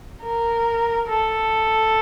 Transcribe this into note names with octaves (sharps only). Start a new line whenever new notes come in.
A#4
A4